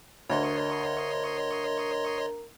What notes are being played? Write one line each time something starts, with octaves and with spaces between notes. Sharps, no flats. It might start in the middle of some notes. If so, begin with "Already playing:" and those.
D2 A#4 C#5 D#5 C6